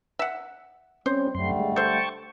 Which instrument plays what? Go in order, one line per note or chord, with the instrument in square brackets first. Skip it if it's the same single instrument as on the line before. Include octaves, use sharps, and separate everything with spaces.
[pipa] E5 F#5
[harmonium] G3 [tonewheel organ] C4 C#4 [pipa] C5
[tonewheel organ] F#2 C6 [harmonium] D3 G3 A3
[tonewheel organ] G#3
[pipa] A4 C5 [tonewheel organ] G5 A5 C#6